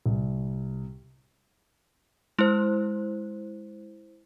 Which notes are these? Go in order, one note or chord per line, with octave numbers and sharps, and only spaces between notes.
C2
G#3 E4 C5